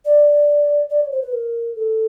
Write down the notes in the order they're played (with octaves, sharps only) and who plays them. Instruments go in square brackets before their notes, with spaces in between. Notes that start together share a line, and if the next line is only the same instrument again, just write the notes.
[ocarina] D5
D5
C#5
C5
B4
A#4
A4